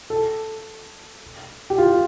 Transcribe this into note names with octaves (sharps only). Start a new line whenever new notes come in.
A4
G4
F4